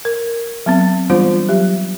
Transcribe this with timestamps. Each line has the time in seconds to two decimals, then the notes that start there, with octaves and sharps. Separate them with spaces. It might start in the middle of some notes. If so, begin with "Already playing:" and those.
0.05 A#4
0.66 F#3 B3 C4
1.10 E3 G3 B3 D4 F4 C5
1.49 F#3 G4